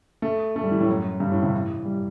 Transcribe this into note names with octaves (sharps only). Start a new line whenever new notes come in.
A3
A3
G3
E3
A2
F#2
G2
A2
C3
E3
G3